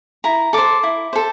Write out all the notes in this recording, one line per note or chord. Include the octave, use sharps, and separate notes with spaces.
E4 A#5
A4 C5 D6
E4
A4 C5